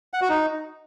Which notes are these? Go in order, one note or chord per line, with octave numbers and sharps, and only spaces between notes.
F#5
F#4
D#4